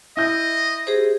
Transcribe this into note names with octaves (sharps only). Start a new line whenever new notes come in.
E4 D#5 G6
G4 G#4 C5